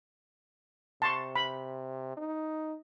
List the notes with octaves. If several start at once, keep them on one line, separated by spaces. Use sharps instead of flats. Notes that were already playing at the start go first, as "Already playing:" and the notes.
C3 A5 C6 C#6
B5
D#4